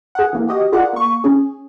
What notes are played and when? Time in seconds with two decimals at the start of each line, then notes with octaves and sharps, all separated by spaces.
0.15 G#4 F#5
0.33 E3 A#3
0.47 F#4 G4 D#5
0.72 F4 G#4 A#4 D5 F#5
0.93 A#3 C#6
1.24 C#4 G#4